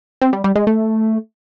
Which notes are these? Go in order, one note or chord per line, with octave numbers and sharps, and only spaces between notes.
C4
G3
G3
G#3
A3